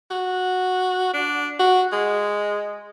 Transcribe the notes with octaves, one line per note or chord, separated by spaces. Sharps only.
F#4
D4
F#4
G#3